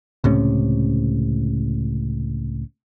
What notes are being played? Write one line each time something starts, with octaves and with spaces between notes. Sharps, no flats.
C#2 A2 C3 C#4